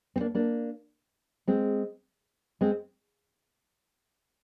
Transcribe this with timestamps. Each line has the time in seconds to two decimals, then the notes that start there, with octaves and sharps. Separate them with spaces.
0.16 C4
0.20 A#3 D4
0.35 A#3 D4
1.47 G#3 C4
2.61 G#3 C4